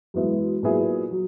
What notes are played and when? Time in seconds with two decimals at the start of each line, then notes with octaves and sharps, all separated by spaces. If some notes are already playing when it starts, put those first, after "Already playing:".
0.14 F#2 E3 G#3 B3 E4
0.63 A#2 F#3 B3 E4 G#4
1.11 F#3